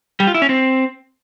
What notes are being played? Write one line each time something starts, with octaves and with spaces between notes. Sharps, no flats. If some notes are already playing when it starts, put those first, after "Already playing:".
G3
F4
E4
C#4
C4